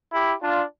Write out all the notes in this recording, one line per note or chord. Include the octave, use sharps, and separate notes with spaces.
E4 G4
D4 F4